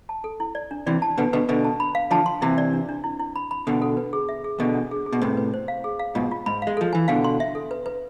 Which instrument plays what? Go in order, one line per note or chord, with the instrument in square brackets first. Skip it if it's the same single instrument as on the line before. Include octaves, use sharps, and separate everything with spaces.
[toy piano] A5
A4
E4
D5
D4
[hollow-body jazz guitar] C3 E3 [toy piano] D5
[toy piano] A5
[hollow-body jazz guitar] B2 D3 [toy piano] B4
[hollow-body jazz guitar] B2 D3 [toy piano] B4
[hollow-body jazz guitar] B2 D3 [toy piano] B4
[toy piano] A5
B5
F5
[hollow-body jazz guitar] D3 F3 [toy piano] A5
[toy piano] C6
[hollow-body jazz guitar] C3 E3 [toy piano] E4
[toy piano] D5
D4
D4
E4
E4
B5
B5
[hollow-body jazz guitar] B2 D3 [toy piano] A4
[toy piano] A4
B4
G#4
E5
G#4
[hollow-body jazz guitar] B2 D3 [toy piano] D4
[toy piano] D4
G#4
G#4
[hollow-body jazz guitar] B2
[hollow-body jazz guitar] A2 C3 [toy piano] B4
[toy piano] B4
C5
F5
G#4
F5
[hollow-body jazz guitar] G#2 B2 [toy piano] F4
[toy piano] F4
[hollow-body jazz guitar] G#2 [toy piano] B5
[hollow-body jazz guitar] G#3 [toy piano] F5
[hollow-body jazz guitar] F3 [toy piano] A4
[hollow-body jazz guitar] E3 [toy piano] G#5
[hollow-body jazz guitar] B2 D3 [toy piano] F5
[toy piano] C6
E5
A4
B4
B4